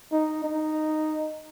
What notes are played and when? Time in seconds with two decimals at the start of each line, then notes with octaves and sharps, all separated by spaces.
0.12 D#4
0.44 D#4